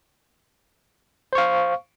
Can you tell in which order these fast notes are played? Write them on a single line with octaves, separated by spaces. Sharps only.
C5 C#6 F5